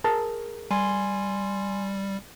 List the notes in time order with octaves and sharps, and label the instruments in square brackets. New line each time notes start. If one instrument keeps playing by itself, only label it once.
[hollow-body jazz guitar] G#4 A#4 A5
[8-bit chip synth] G3 [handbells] G#5 C6